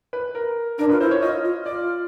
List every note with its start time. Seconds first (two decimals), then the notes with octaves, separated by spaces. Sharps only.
0.13 B4
0.35 A#4
0.78 D4 A#4
0.89 F4 B4
1.00 E4 C5
1.11 C#5
1.22 F4 D#5
1.44 F4
1.66 F4 D5